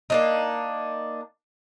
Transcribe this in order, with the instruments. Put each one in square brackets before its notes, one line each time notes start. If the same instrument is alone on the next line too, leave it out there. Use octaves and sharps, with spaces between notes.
[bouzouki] A#3 D4 D#4